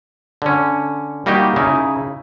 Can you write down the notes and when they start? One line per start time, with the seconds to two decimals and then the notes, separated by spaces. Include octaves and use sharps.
0.42 D3 C#4
1.26 G3 A#3 D#4 F#4 G4
1.56 C#3 D#4 E4